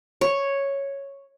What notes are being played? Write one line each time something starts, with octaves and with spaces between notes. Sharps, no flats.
C#5